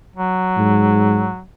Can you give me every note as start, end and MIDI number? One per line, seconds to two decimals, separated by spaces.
0.16 1.41 54
0.58 1.32 44